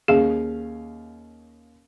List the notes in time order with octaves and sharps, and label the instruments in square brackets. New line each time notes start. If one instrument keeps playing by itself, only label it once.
[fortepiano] D#2 C#4 F5 [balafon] G#4